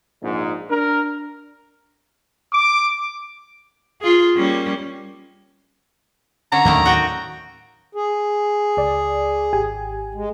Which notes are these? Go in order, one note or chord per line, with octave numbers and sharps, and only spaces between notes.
A#1 G#2
D4 A#4
D6
F4 G#4
G3 A#3 C#4
D3 C#4 A#5
D#2 A2 D#3 F#3 A3 A#3
F#4 G5
G#4
C#2 D5
G#1 G4 G#5
G#3